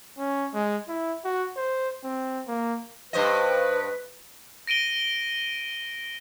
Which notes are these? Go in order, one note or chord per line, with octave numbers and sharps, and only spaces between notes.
C#4
G#3
E4
F#4
C5
C4
A#3
G2 B4 C5 D#5
A#6 D7 D#7 G7